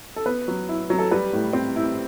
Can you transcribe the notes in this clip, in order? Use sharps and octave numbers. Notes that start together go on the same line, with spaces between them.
A4
B3 B4
F#3
E4
F#3
A4
G3 B4
A2
C4
E4